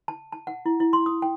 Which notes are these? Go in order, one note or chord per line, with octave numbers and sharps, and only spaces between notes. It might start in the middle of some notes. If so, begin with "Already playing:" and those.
A5
A5
F#5
E4
E4
C6
D#6
G5